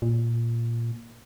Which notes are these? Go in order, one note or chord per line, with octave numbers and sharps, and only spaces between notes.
A#2